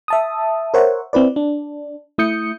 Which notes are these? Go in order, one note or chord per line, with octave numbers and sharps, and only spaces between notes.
E5 A5 D#6
A#4 C5 C#5 E5 F#5
C4 E4 B4 D5
D4
A3 E4 D#6 G6 C#7